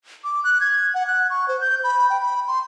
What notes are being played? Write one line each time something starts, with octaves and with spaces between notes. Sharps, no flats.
D6
F#6
G#6
F#5
F#6
C#6
C5
G6
B5
G5
B5
C6